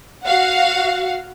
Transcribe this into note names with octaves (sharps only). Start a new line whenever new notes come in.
F#4 F5 F#5